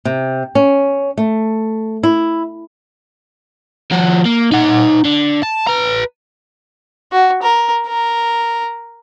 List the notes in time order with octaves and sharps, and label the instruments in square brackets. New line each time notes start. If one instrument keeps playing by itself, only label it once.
[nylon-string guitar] C3
C#4
A3
E4
[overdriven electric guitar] F3 F#4
A#3
D#4 F#5
D3
A5
B4 A#5
[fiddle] F#4
A#4
A#4